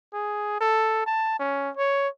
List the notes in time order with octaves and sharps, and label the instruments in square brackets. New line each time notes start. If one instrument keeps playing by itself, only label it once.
[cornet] G#4
A4
A5
C#4
C#5